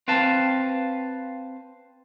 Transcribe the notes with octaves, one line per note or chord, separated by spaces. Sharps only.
C4 B4 F5 A5